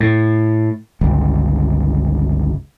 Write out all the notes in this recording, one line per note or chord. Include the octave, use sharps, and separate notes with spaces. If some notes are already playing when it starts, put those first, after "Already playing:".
A2
G1 C#2